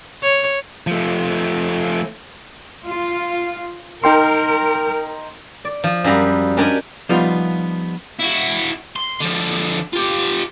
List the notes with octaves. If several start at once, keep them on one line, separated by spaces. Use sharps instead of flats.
C#5
F3 A3
F4
D#4 A#4 G5 C6
D5
F3
F#2 F3 G3 A#5 B5
C#4 D4 G4 A#4 C#5 D#5
F3 G3 B3 D#4 F4
E4 F#4
C6
D3 F3
F4 G4